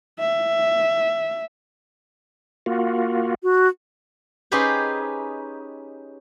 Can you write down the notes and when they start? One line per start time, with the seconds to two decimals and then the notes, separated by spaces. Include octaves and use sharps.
0.19 E5
2.66 A#3 F4 F#4
3.43 F#4
4.52 C#4 D#4 G4 G#4 B4 C5